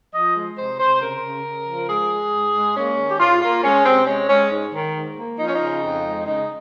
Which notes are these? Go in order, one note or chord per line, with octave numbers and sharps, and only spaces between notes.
F3 D#5
G#3
C3 C5
C3 C5
C#3 A#4
C#3
C#3
F3
G#3 G#4
G#3
G#2
G#3
A#3 C#4
D#3
G4
G#2 F4
A#3 F4
G#3 C#4
C3 C4
G#3 C#4
G#3 C#4
G#2
D#3
G#2
A#3
F3 D#4
C#4
C#3 D#4
F2
G#3
C#3 D#4